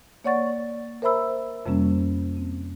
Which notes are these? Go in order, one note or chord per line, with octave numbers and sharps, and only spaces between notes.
A#3 C#5 D5 F#5 C#6 A6
A#4 C5 E5 A#5 B5 E6
F2 C3 G3 A#3 C#4
C4